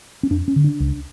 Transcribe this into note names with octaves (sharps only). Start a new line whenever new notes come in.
C#4
F2 D4
C#4
D3
D4
C#2